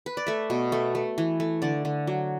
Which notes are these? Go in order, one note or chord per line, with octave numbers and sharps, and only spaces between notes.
B4
D5
A3 E5
B2
A3
A3
E3
A3
D3 D5
D3
F#3